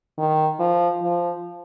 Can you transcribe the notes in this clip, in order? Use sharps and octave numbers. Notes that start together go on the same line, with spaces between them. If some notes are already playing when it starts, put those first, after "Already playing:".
D#3
F3
F3